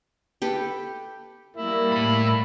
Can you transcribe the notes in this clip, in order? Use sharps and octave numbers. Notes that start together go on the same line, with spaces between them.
G4 A4 B4
G3 A#3 E4
A2 B5